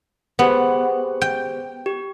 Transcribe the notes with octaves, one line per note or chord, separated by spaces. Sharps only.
B3 G4 G#4 C5
G5
G4